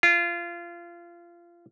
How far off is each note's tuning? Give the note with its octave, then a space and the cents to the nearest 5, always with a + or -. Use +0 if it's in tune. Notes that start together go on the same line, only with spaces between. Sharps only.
F4 -25